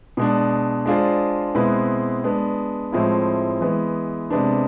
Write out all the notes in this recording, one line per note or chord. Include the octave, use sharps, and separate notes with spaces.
B2 G#3 D4
G#3 D4 F4 G#4 C5
B2 G#3 C4 E4 B4
G#3 B3 D4
A2 F3 G#3 C4 E4
E3 G#3 B3
C3 G#3 B3 D4